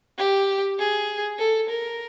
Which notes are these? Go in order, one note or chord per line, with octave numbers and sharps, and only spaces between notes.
G4
G#4
A4
A#4